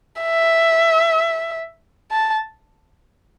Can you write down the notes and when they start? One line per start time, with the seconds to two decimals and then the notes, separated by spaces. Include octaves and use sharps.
0.22 E5
2.11 A5